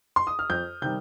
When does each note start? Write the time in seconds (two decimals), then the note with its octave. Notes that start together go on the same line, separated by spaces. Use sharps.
0.16 C6
0.27 D#6
0.39 F6
0.50 F2 G6
0.82 C3 D#3 G3 G6